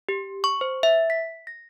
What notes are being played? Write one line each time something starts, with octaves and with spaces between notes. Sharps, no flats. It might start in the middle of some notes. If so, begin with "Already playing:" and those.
G4
C#6
C5
E5
B6
A#6